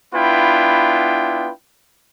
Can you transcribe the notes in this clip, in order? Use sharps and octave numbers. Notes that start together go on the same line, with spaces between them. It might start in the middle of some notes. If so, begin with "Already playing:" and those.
B3 D4 E4 F4 B4 G5